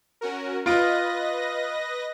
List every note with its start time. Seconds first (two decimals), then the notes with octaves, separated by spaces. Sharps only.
0.21 C#4 F#4 A#4
0.66 F4 B4 D#5 A#6 D7